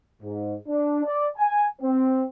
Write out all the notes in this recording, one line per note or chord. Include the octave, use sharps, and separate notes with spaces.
G#2
D4
D5
G#5
C4